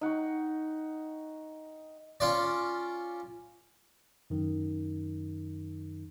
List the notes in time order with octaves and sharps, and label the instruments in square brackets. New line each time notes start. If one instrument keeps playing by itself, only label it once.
[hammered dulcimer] D#4 F#5 G5 C#6
[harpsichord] C#4 F4 D5
[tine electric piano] F#2 D#3